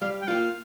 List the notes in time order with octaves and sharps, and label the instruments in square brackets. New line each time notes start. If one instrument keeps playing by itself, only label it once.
[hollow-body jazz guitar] G3 [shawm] F5
[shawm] G5
[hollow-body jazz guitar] A#3 F4 [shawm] F5